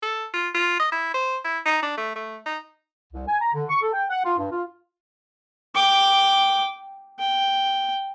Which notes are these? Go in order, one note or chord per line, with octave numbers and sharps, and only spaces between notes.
A4
F4
F4
D#5
E4
C5
E4
D#4
D4
A3
A3
D#4
C2
G#5
A#5
D3
C#6
A4
G5
F#5
F4
G2
F4
G5 D6
G5